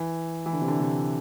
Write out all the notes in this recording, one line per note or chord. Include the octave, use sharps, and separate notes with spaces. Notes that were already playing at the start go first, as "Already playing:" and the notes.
Already playing: E3
E3
D3
C3
D3
C3